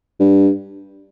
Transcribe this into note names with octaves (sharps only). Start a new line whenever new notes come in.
G2